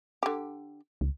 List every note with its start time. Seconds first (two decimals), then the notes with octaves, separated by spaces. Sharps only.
0.23 D3 G4
1.01 C#2